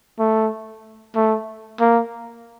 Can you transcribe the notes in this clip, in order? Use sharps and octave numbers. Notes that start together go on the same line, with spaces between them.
A3
A3
A#3